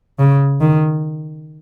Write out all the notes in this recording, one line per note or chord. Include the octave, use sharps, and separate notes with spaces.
C#3
D#3